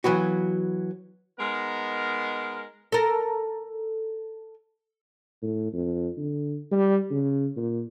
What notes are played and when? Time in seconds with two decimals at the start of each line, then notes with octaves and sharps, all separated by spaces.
0.04 E3 F#3 B3 F#4
1.40 G#3 B3 D#4 A#4
2.92 A4 A#4
5.42 A2
5.73 F2
6.17 D3
6.71 G3
7.11 C#3
7.57 A#2